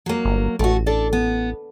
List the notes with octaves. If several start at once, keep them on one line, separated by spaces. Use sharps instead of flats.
F#3 A#3
G1
A1 A3 F#4
D4 A4 D5
B3